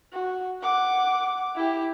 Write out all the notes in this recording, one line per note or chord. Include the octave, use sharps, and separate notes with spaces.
F#4
F#5 D6
E4 G4